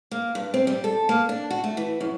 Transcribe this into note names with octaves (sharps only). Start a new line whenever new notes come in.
A#3
G2
C4
G3
A4
A#3
D4
F#4
A3
E3
F#2